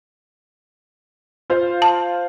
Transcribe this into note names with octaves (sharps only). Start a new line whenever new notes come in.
F4 C5 F5
A5